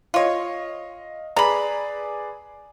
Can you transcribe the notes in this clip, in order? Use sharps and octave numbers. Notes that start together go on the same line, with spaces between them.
F4 C#5 D#5 F5
G#4 B4 D5 A#5 B5